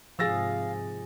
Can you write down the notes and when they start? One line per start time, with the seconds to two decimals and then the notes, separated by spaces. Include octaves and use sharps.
0.19 G#2 C3 F3 G#4 F5 E6 A6 A#6